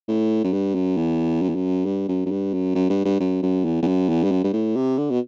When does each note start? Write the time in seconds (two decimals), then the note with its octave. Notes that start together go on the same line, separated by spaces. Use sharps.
0.08 A2
0.44 F#2
0.53 G2
0.75 F#2
0.97 E2
1.42 F#2
1.49 E2
1.55 F#2
1.86 G2
2.08 F#2
2.26 F#2
2.31 G2
2.53 F#2
2.75 F#2
2.90 G2
3.05 G2
3.20 F#2
3.42 F#2
3.65 E2
3.82 E2
3.87 F#2
4.09 E2
4.24 G2
4.31 F#2
4.44 G2
4.53 A2
4.76 C3
4.98 D3
5.10 B2